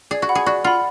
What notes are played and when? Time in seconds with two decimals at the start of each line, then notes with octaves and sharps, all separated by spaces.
0.11 G#4 D5
0.22 F#4
0.29 F#5 B5
0.35 G#4
0.46 F#4 D5
0.64 F4 F#5 B5